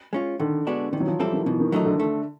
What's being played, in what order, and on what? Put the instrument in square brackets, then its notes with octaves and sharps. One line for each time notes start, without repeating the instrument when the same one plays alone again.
[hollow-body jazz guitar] G#3 C#4 F4
[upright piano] D3 [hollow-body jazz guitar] D#3
[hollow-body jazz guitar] G#3 B3 D4 F#4
[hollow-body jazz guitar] D#3 [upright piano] E3
[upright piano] F#3
F3
[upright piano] E3 [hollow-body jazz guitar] G3 C4 E4 A4
[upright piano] D#3
[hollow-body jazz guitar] B2 [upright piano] E3
[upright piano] D#3
[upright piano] D3 [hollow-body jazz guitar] F#3 A3 C4 D#4
[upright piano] D3
[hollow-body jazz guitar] A3